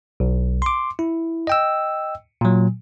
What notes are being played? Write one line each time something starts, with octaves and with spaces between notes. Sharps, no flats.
B1
C6 D6
E4
D#5 G5 E6
A#2 F#3